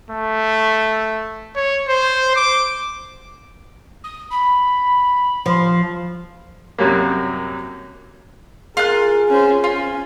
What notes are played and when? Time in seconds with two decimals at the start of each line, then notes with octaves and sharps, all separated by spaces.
0.10 A3
1.55 C#5
1.88 C5
2.36 D6
4.04 D#6
4.30 B5
5.46 F3
6.78 F#2 C3 F#3 G3 A#3
8.77 F4 G#4 A#4 F#6
9.29 C#4 C5
9.64 C#4 F4